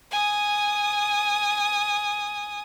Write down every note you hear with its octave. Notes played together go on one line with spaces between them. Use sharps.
G#5 D#6